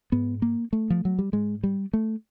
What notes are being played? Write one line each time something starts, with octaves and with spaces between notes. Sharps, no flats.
G#2 B3
A#3
A3
F3
F#3
G3
G#2 G#3
G3
A3